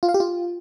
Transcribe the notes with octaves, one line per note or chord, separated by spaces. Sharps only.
F4
F5
G4
F4